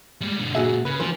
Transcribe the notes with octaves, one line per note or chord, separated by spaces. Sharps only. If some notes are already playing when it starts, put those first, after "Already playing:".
G3 G#3
B2 D3
A#2 C#3 F#4 G#4 E5
C#3 B4
D2 E3 F3 C5